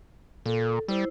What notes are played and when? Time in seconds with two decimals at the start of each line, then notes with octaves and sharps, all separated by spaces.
0.46 A#2 A4
0.88 G3 E4 C5